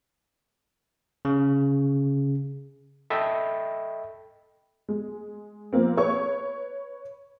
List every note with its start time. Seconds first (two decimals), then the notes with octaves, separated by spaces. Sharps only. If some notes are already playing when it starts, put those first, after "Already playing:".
1.25 C#3
3.10 A4 D#5 E5 G5 B5
4.89 G#3
5.73 F3 A#3 C4
5.97 B4 C#5 C#6